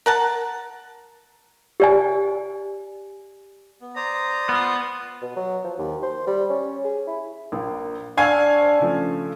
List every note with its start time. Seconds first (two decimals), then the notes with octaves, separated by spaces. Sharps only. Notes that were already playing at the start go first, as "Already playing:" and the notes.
0.06 A#4 F#5 A5
1.80 G4 D5 G#5
3.80 B3
3.96 C5 D5 A#5 D#6
4.49 B3 F4
5.22 B2
5.36 F#3
5.64 F3
5.78 D#2
6.03 C5
6.27 G3
6.50 C#4
6.84 G#4
7.07 E4
7.52 A#1 A#3
8.17 D4 F5 G#5 C#6 E6 G#6
8.61 C5
8.80 C#3 F3 A3